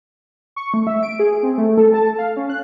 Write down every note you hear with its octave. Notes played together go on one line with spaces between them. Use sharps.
C#6
A3
E5
D7
G#4
C4
A3
A4
A5
F5
C#4
F#6